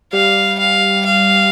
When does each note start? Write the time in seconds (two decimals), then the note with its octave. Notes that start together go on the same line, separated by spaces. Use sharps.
0.13 G3 F5
0.59 F5
1.05 F5